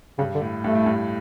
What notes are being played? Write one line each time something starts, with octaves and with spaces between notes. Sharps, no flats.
G2 C#3
D3
A2
G2 A3
A2
G2